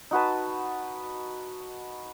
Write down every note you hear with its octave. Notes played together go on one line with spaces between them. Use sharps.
D#4 F#4 B4 A5